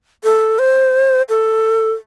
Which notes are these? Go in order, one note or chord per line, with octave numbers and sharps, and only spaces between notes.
A4
C5
A4